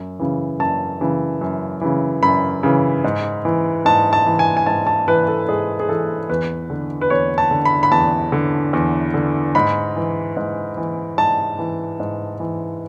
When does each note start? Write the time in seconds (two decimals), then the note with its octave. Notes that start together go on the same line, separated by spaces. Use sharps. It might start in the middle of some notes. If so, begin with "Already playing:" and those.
Already playing: F#2
0.19 C#3 E3
0.59 F#2 A5
1.01 C#3 E3
1.41 F#2
1.81 C#3 E3
2.23 F#2 B5
2.63 C#3 E3
3.04 G#2
3.45 E3
3.85 G#2 A5
4.13 A5
4.26 E3
4.39 G#5
4.57 G#5
4.66 G#2 A5
4.87 A5
5.08 E3 B4
5.28 A4
5.49 G#2 G#4
5.80 G#4
5.88 E3 A4
6.29 E2 B4
6.70 D3
7.01 B4
7.10 E2 C#5
7.38 A5
7.51 D3
7.65 B5
7.83 B5
7.92 E2 A5
8.32 D3
8.73 E2
9.14 D3
9.55 G#2 B5
9.96 E3
10.37 G#2
10.77 E3
11.18 G#2 A5
11.59 E3
12.00 G#2
12.40 E3